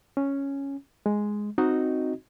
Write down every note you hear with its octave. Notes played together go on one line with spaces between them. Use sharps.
C#4
G#3
C4 D#4 F#4 D#5